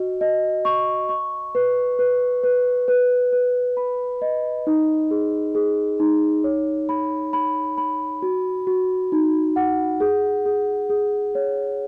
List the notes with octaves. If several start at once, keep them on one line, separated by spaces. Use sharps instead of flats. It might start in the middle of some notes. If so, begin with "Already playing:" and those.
Already playing: F#4 D#5
D#5
C#6
C#6
B4
B4
B4
B4
B4
B5
D#5
D#4
G#4
G#4
D#4
C#5
B5
B5
B5
F#4
F#4
D#4
F#5
G#4
G#4
G#4
C#5